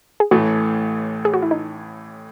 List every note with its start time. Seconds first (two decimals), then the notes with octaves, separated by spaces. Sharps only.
0.20 G#4
0.31 A1 A2 E3 A3 F#4
1.25 G#4
1.34 F#4
1.42 E4
1.51 D#4